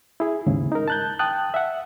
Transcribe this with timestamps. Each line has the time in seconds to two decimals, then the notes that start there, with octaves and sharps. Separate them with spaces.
0.20 E4 G#4
0.47 D#2 G#2 C#3
0.72 D#4 A#4
0.88 A5 F#6 G6
1.19 G5 A5 D#6 F#6
1.54 E5 F#5